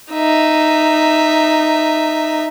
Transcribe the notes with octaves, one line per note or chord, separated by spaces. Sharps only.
D#4 E5